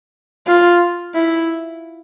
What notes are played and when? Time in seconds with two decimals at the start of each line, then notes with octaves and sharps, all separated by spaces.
0.47 F4
1.14 E4